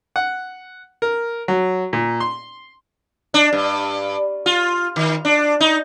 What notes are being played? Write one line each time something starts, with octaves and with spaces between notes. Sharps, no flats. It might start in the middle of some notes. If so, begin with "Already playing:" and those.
F#5
A#4
F#3
A#2
C6
D4
G2
F4
D#3
D4
D#4